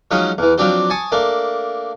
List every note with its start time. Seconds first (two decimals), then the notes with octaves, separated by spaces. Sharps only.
0.11 F3 F#3 G#3 C#4 D#4
0.38 E2 E3
0.58 F3 F#3 C4 D4 G4 C5
0.90 G#5 A5 C#6 D#6
1.12 A3 A#3 D4